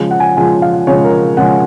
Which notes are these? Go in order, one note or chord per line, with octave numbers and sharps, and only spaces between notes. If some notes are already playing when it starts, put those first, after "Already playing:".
Already playing: C#3 F3 G#3
F#5
G#5
C#3 F3 G#3 G#5
F5
C#3 F3 G#3 C#5
A#4
C#3 F3 G#3 F#5